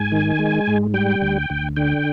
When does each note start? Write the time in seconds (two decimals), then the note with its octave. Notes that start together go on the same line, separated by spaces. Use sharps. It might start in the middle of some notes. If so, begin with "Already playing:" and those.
Already playing: G#2 G#5
0.12 D#3
0.39 G#3
0.68 G#2
0.94 G3 G5
1.22 D2
1.50 D2
1.76 D3 G5